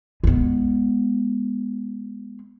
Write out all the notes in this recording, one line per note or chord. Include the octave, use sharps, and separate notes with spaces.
G#3 B3